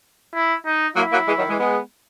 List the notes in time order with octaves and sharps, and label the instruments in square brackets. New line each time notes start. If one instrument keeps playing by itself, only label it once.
[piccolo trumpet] E4
D#4
[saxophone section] F#3 A#3 [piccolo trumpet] E4
[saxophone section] F#3 A#3
E3 G#3
D#3 F#3
E3 G#3
G#3 B3